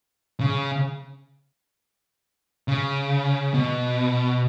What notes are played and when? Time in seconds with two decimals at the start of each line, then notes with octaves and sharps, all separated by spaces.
0.40 C#3
2.68 C#3
3.54 B2